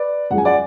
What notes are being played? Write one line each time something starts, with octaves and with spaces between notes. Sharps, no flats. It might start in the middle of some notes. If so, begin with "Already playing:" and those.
Already playing: B4 D5
F#2 F3 G#3 F#5
G#5
D5 F#5